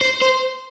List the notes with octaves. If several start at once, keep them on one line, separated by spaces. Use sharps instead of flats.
C5
C5